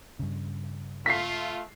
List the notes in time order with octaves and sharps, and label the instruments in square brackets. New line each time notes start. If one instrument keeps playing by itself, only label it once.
[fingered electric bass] G2 C#3
[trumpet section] A3 F4 [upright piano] B6 C7